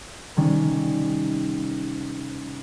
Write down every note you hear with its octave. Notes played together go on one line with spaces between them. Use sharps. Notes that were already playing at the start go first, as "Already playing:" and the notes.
C3 D#3 G3 C#4